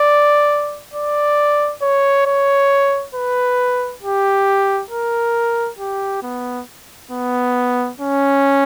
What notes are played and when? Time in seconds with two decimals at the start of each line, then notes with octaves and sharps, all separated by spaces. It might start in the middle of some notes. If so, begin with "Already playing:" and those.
Already playing: D5
0.94 D5
1.82 C#5
2.26 C#5
3.15 B4
4.03 G4
4.91 A#4
5.79 G4
6.23 B3
7.11 B3
8.00 C#4